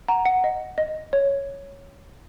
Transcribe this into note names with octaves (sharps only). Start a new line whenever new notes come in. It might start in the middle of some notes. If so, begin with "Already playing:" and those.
F#5 A#5
F#5
D#5
D#5
C#5